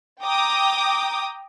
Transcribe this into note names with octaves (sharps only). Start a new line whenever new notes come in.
G5 A#5 D6 D#6 G6